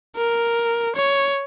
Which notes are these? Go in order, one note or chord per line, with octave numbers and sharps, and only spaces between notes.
A#4
C#5